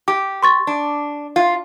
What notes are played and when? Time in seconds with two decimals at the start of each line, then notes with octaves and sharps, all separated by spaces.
0.08 G4 D6
0.43 C6 C#6 A6
0.67 D4
1.36 F4